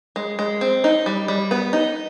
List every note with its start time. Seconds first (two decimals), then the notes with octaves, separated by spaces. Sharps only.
0.16 G#3
0.39 G#3
0.61 C4
0.84 D#4
1.06 G3
1.28 G3
1.51 B3
1.73 D#4